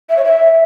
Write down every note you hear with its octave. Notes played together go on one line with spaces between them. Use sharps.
E5
C#5
E5